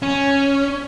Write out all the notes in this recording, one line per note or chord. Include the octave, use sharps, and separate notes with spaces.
C#4